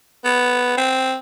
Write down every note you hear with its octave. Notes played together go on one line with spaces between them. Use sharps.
B3
C4